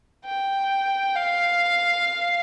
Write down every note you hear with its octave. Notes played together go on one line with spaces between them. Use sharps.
G5
F5